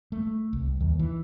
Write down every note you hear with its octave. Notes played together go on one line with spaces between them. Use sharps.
A3
C2
D#2
E3